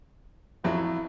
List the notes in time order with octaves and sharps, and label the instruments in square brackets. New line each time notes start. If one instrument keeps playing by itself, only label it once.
[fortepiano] A1 F2 F#3 [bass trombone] E4